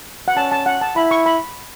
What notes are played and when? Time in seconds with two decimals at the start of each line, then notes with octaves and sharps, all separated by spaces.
0.28 F#5
0.36 C#4 A5
0.52 A5
0.66 F#5
0.81 A5
0.96 E4 B5
1.11 C#6
1.26 B5